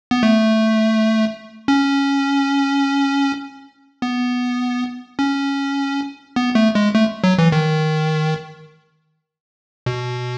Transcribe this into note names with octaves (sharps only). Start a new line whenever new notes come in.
B3
A3
C#4
B3
C#4
B3
A3
G#3
A3
F#3
E3
D#3
B2